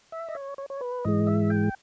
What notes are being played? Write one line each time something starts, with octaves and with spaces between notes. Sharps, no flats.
E5
D#5
C#5
C#5
C#5
B4
G#2 E3 G#3 D#5
E5
G5